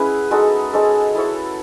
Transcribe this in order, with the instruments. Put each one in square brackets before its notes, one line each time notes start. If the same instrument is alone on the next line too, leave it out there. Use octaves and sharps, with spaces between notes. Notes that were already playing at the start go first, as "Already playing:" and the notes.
Already playing: [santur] G#3 B3 C#4 E4 G#4 B4
G#3 D#4 F#4 A4
G#3 D#4 A4 C#5
E4 A4 C#5